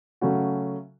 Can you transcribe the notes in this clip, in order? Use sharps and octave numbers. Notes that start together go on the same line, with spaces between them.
C#3 F#3 A3 C#4 F#4